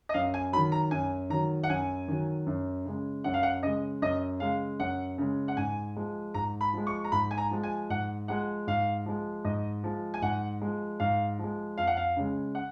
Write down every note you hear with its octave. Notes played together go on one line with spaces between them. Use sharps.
D#5
F#2 F5
G#5
D#3 F#3 B5
A#5
F#2 G#5
D#3 F#3 A#5
F#5
F#2 G#5
D#3 F#3
F#2
C#3 G#3
F#2 F#5
F5
F#5
C#3 G#3 D#5
F#2 D#5
C#3 G#3 F5
F#2 F#5
C#3 G#3
F#5
G#2 G#5
F3 G#3
G#2 A#5
B5
F3 G#3
C#6
A#5
G#2 B5
G#5
A#5
F3 G#3
G#5
G#2 F#5
F3 G#3 F#5
G#2 F5
F3 G#3
G#2 D#5
F3 G#3
G#5
G#2 F#5
F3 G#3
G#2 F5
F3
G#3
F2 F5
F#5
F5
C#3 G#3
F#5